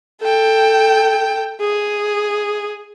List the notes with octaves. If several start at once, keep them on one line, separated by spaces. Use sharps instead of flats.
A4 G5
G#4